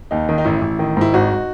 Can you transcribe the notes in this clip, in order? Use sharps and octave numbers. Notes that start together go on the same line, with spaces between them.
D#2 D#4
D#3
D#4
A1 E4
A1
D#3
G#2 E4
G#1 D#4 F#4